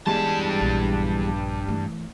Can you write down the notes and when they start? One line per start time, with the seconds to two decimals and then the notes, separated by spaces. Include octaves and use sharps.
0.07 E2 G2 G3 G#3 A5
0.61 A#1
1.68 E3 A3